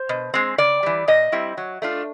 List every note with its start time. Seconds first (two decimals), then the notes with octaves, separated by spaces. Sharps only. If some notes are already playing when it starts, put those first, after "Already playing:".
Already playing: C5
0.09 B2
0.34 G#3 C4
0.58 C#3 D5
0.83 E3 G3
1.08 A#2 D#5
1.32 G3 C4 E4
1.57 F#3
1.82 A3 D4 F4